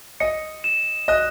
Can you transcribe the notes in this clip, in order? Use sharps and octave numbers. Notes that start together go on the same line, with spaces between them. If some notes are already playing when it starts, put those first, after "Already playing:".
D#5 C#7
E7
D#5 F#6